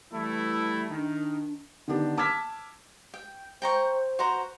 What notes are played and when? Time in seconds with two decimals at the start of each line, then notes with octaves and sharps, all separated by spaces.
0.12 E3 G3 A3 E4
0.90 D#3 D4
1.88 D3 D#3 B3 D4 G4
2.17 A5 D6 E6 F6 G#6 B6
3.14 G5
3.62 C5 G5 A#5 C#6
4.19 F#4 C5 A#5